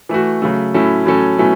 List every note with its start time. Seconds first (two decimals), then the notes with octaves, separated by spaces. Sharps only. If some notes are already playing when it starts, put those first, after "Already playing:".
0.09 E3 A3 F#4
0.42 C#3 F#3 A3
0.74 A2 F#3 C#4 E4 A4
1.06 A2 F#3 C#4 A4
1.38 B2 F#3 A3 C#4 E4